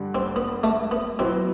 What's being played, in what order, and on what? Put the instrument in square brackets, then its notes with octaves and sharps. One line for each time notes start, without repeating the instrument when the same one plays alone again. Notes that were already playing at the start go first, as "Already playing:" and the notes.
Already playing: [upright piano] G2 D3 G3 D4
[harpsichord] C4
B3
A3
B3
[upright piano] B2 F#3 B3 E4 [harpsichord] C4